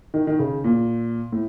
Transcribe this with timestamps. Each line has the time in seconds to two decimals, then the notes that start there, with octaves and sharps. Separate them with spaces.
0.14 D#3
0.27 D#3
0.39 C#3
0.64 A#2
1.32 A2